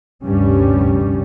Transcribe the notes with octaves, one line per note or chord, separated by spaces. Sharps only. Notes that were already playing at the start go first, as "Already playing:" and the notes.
F1 D2 G2 G3 C#4